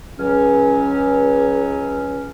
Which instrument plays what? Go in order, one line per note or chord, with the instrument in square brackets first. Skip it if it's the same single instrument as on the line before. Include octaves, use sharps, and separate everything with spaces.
[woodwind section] C#2 F#3 C#4